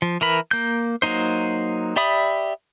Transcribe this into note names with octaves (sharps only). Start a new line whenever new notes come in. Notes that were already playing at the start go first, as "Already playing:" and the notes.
F3
E3 A#4 B5
A#3 G6
F#3 A#3 D#4 C5
G4 D5 E5 B5 D#6